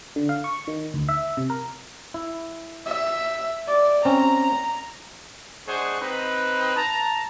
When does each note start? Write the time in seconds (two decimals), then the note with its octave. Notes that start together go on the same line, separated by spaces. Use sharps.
0.16 D3
0.29 F5
0.44 C#6
0.67 D#3
0.94 D2
1.09 E5
1.37 C3
1.50 A#4
2.14 E4
2.86 E5
3.67 D5
4.05 C4 C#4 A#5
5.67 G#3 D4 G#4 C5 F#5 C#6
6.00 C4 D#4 B4
6.76 A5 A#5